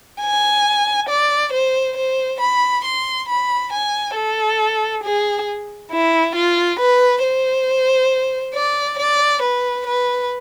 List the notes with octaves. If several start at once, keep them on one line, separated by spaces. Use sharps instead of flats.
G#5
D5
C5
C5
B5
C6
B5
G#5
A4
G#4
E4
F4
B4
C5
D5
D5
B4
B4